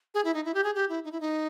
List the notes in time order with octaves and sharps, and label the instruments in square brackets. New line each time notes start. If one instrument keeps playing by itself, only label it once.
[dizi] G#4
E4
D#4
E4
G4
G#4
G4
E4
D#4
E4
D#4